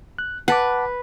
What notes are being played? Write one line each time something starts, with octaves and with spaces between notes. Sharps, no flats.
F#6
B4 F#5 A5 D6